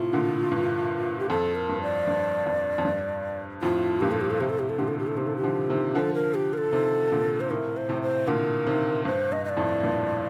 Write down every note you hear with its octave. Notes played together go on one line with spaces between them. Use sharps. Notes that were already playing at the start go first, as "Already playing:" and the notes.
Already playing: A2 C3 F4
A#2 D3
G2
G4
F2 A4
A#4
G2
D5
G2
F2
F2
G2
F2 A2 F4
G2 A#2 G4
A4
G4
A4
A2 C3 G4
A4
G4
A4
A#2 D3 G4
A4
G4
A4
C3 D#3 G4
A4
G4
D3 F3
C3 D#3
D3 F3 A4 A#4
A#4
G4
A#4
A4
C3 D#3
A#2 D3
C5
A2 C3 A#4
C5
A2 C3
C5
A#2 D3 A#4
C3 D#3
G2 C5
G2 D#5
D#5
D5
F2 A2
G2 A#2